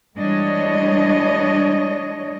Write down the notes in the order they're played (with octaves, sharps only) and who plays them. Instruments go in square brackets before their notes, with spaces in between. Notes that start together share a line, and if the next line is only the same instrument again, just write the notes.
[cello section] E3 G3 G#3 D4 C#5 D#5